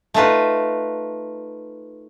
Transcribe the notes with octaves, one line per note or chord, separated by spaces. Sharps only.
A3 D#4 F4 B4